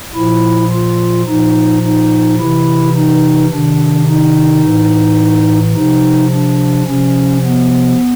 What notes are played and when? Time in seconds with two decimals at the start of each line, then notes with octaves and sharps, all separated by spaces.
0.15 A#2 F3 E4
0.71 F4
1.27 A#2 F3 D#4
1.84 D#4
2.40 C3 E3 E4
2.95 D#4
3.51 C3 D#3 D4
4.08 D#4
4.63 A2 E3
5.75 C3 F3 D#4
6.32 D4
6.87 C3 F3 C#4
7.44 B3